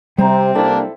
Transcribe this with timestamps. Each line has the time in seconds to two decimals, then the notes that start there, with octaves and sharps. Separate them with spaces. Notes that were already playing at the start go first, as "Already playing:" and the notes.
0.18 C3 G3 C4 C5 A#5
0.55 C2 A#3 D4 E4 A4 D5